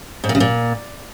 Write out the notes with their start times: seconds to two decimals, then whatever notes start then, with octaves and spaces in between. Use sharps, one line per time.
0.24 G#2
0.29 A#2
0.35 C#3
0.40 A#2